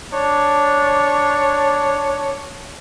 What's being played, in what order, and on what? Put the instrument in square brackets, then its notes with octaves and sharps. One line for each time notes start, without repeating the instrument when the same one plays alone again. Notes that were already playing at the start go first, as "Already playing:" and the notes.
[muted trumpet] D4 [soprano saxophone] C#5